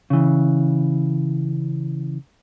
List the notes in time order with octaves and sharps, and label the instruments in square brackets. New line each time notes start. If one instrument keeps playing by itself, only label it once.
[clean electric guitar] C#3 E3